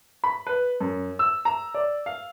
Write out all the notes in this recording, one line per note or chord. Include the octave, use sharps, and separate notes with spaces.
B5
B4
F#2
E6
A#5
D5
F5